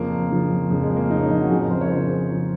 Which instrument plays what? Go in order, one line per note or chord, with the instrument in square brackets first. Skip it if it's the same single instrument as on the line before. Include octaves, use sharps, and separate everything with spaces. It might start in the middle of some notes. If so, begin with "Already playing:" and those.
Already playing: [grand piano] F2 C#3 F3 A#3
F2 C#3 F3
F2 C#3 F3 G#3
G#3
A#3
F2 C#3 F3 D#4
C#4
D#4
F#4
F2 C#3 F3 G#4
A#4
C5
C#5
F2 C#3 F3 C5
C#3 F3